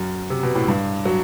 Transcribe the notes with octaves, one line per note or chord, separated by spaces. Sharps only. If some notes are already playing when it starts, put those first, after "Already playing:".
Already playing: F#2
C3
B2
A2
G2
F#3